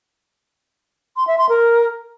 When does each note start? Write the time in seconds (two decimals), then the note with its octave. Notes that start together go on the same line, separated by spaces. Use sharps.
1.17 C6
1.27 E5
1.38 C6
1.49 A#4